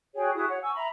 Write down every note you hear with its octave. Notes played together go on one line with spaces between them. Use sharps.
F#4 G#4 C#5 G5
E4 F#4 G#4 D#6
C#5 F#5
G#5 C#6 E6
E5 A#5 B5